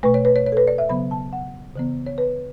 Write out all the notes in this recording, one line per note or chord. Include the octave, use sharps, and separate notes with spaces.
B2 A3 B4
C#5
B4
C#5
C#5
A4
B4
D5
E5
C#3 F#3 B3 B5
A5
F#5
C#3 E3 B3
C#5
B4